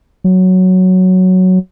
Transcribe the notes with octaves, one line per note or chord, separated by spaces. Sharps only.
F#3